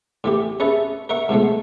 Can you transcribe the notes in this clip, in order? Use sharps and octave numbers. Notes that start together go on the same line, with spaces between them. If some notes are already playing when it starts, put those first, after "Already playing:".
A2 E3 G4
C#4 G#4 B4 E5 A5
A#4 E5 F#5 C#6
G#2 B2 F3 A3